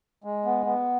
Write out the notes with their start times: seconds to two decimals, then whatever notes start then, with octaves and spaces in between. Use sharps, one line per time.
0.24 G#3
0.45 B3
0.66 B3